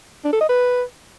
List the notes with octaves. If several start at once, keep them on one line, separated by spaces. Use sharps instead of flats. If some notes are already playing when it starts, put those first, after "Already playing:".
D4
A4
D#5
B4